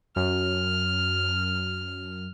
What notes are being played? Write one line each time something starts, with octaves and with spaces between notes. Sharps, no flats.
F#2 F6